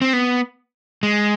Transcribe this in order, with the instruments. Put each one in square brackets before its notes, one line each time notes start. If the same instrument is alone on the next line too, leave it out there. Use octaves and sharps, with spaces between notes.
[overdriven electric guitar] C4
B3
G#3